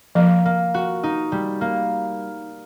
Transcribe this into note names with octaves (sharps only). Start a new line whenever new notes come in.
F3 A#3
A#3
F#4
D#4
G3
A#3